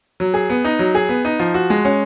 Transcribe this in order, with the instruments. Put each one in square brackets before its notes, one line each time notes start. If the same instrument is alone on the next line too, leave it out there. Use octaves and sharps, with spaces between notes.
[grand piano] F#3
G#4
B3
D#4
F#3
G#4
B3
D#4
F3
F#4
G#3
C#4